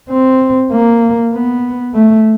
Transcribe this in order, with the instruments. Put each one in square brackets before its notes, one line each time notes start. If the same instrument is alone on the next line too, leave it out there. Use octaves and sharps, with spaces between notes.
[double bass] C4
A#3
B3
A3